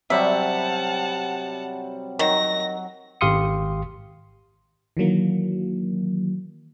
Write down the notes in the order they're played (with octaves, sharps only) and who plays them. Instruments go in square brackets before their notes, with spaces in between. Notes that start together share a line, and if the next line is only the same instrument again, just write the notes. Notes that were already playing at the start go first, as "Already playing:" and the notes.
[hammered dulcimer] C3 F#3 G3 [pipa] E5 [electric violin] F#5 A5
[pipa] D#3 [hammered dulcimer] F#3 [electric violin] A#6
[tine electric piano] G#1 G4 F5 C6 D#6 C#7
[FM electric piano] D#3 E3 F#3 A#3